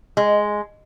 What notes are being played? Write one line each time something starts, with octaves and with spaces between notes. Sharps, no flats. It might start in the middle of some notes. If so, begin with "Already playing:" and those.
G#3